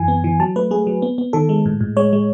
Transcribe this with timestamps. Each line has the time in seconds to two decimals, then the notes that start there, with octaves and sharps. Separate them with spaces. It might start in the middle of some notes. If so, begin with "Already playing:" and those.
Already playing: F#2 E3 G#5
0.08 B3
0.24 E3
0.40 F#3 A5
0.56 A3 B4
0.71 A3 G#4
0.87 F#3
1.02 B3
1.18 B3
1.33 D#3 A4
1.49 G#3
1.66 A2
1.81 A2
1.97 G#3 C#5
2.13 G#3